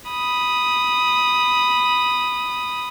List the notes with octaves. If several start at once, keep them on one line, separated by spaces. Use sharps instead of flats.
B5 D#6